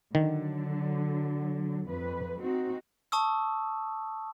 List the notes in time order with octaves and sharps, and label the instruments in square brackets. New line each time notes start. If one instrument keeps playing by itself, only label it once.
[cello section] D3 F#3 [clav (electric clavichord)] D#3
[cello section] F2 B4
C4 D#4 F#4
[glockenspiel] A5 C#6 D#6 E6